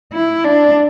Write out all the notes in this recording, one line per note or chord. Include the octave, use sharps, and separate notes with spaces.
E4
D4